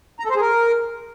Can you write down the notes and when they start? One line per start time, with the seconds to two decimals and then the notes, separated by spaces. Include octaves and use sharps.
0.20 A#5
0.25 A4
0.30 C5
0.36 G#4
0.41 A#4